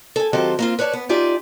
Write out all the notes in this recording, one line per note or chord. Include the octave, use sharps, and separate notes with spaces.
A4 G#5
D#3 F#3 C4 F4 G4 A4
A#3 C4 F4
B4 C#5 D5 E5 A5
B3
D#4 F4 G4 D5 E5 G#5